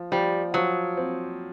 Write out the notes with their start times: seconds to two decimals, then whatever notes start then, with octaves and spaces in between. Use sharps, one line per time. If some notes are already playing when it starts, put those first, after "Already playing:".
Already playing: F3
0.12 F3 G3
0.54 F3 F#3
0.97 C4